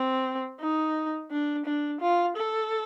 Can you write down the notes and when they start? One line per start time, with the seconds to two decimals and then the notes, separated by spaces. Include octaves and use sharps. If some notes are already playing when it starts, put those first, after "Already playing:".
Already playing: C4
0.60 D#4
1.31 D4
1.66 D4
2.01 F4
2.37 A4